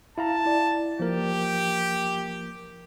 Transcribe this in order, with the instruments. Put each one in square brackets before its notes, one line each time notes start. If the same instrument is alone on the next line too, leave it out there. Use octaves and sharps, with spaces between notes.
[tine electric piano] E4 F5 A#5 [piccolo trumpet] A5
[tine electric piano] E4 D5
[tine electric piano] F3 A#3 A#4 [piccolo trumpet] G4